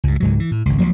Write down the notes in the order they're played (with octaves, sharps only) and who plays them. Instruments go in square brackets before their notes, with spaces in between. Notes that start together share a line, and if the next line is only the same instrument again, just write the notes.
[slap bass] C#2 G2
C#2 G#2 F#3
E3
A2
G#1 C#2
C#2 F3 F#3 A#3